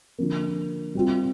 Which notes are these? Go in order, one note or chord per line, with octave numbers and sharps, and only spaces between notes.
D3 F3 A#3
G3 C4 F4